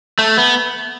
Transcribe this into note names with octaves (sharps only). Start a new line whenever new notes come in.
A3
B3